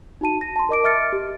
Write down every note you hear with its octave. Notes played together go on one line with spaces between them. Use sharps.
D#4 F#4 A5 D#7
A#6
A5 C6
A#4 D#5 D6 D7
D#5 E5 D6 F6 A6 C#7
G4